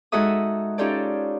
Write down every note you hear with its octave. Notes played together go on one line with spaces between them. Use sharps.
G#3 D#4 F#4 A4 E5 D#6
C#4 D#4 F4 G4 A4 D5